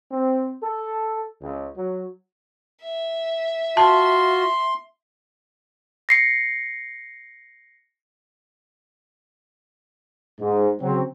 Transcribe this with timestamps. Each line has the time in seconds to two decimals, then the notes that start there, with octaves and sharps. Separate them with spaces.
0.11 C4
0.62 A4
1.42 C#2
1.76 F#3
2.83 E5
3.77 F4 F#4 A5 C6
6.09 A#6 C7 C#7
10.40 G#2
10.81 C#3 F#3 C4